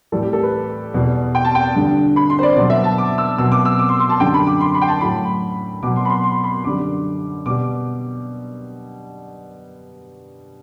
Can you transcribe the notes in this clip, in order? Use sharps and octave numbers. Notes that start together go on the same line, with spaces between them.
A2 E3 G3 A4
G4
A4
B4
E2 B2 G3
G5
A5
G5
G2 D3 G3
B5
C6
C5
D5
B2 F#3 D5
E5
A5
D6
E6
B2 F#3 E6
D6
E6
D6
C6
C6
A5
F#2 D3 G3 G5
B5
D6
C6
B5
G5
A5
A2 F#3 B5
B2 F#3 D6
C6
B5
C6
C6
B5
F#2 D3 G3 D6
B2 G3 D6